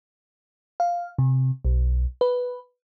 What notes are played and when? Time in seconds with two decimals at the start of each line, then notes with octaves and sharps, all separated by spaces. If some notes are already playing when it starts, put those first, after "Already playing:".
0.80 F5
1.18 C3
1.65 B1
2.21 B4